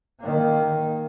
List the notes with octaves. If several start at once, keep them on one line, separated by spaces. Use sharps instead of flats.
D#3 A#3